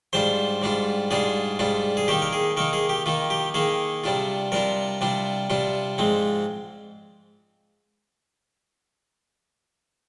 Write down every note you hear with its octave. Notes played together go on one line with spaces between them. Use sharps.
G#2 G3 D4 F4 C5
G#2 G3 D4 F4
G#2 G3 D4 F4 G#4
G#2 G3 D4 F4
G#4
D#3 A#3 D#4 G4
A#4
G#4
D#3 A#3 D#4 A#4
G#4
G4
D#3 A#3 D#4 F4
G4
D#3 A#3 D#4 G#4
C3 G3 D4 F4
C3 G3 D4 F4 A#4
C3 G3 D4 F4
C3 G3 D4 F4
G#2 F3 G#3 C4